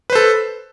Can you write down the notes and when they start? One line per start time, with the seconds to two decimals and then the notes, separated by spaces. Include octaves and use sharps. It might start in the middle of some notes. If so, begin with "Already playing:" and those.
0.10 B4
0.12 C5
0.15 A4